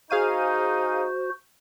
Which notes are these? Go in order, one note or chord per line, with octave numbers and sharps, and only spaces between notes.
D#4 F#4 G#4 C5 F5 D#7